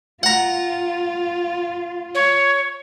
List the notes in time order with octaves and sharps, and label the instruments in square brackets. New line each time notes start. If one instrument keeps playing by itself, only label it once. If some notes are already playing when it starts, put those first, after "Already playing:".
[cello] F4 [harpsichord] F#5 A#5
[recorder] C#5